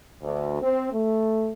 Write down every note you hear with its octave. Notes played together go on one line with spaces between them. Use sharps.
D2
C4
A3